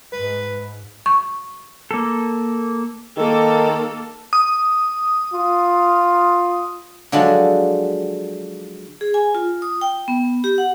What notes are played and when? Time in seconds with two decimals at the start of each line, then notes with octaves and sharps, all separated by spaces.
0.13 G#2 B4
1.06 C#6
1.91 A#3 A4
3.18 D#3 A#3 A4
4.33 D#6
5.33 F4
7.12 D3 F3 F#3 G#3 D4
9.01 G#4
9.14 G#5
9.35 F4
9.62 D#6
9.81 G5
10.08 B3
10.44 G4
10.58 F#5